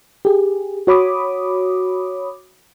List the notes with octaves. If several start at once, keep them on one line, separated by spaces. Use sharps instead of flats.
G4 G#4
F#4 C#5 B5 D6 D#6